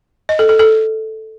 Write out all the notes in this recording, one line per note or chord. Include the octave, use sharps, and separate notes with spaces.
D#5
A4
A4
A4